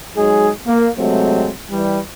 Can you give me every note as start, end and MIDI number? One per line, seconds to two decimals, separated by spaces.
0.16 0.49 54
0.16 0.49 56
0.16 0.49 63
0.16 0.49 68
0.66 0.88 58
0.97 1.50 48
0.97 1.50 54
0.97 1.50 56
0.97 1.50 57
0.97 1.50 60
1.69 1.98 52
1.69 1.98 55